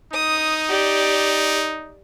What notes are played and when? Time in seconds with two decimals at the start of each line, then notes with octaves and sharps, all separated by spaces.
0.13 D#4 D#6
0.69 G4 D5